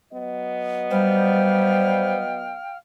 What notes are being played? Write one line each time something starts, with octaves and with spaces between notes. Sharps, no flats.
F#3 B3 D#5
G3 C5 F5 G5 F6